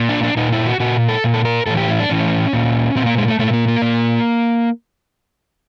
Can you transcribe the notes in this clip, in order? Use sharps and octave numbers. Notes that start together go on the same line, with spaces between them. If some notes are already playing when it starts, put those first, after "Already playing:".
Already playing: A#2
D4
D4
A#2 D#4
E4
F#4
A#2 F#4
A4
A#2
A4
A#4
A2 E3 A4
G4
E4
D4
A2 E3 C#4
A#2
A#2 C4
A#3
G#3
A3
A#2 A3
A#3
A#3
A#2